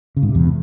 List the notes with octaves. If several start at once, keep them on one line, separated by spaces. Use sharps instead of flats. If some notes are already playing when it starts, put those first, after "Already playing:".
C#3
G#2
C3
E2